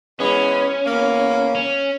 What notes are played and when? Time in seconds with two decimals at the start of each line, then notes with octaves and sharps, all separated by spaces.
0.20 E3 G#3 B3 C#4
0.86 E2 A#3
1.55 C#4